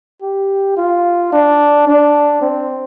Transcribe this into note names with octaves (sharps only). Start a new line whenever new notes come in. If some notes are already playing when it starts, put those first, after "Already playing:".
G4
F4
D4
D4
C4